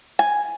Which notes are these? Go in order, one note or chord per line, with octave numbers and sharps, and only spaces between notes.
G#5